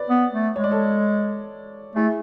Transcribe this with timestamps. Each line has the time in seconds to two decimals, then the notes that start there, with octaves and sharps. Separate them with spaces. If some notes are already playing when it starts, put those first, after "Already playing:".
Already playing: B4 C#5 D5
0.10 B3
0.33 A3
0.56 G#3 C#5
0.64 D5
0.71 A4 C#5
1.96 A3 E4 G#4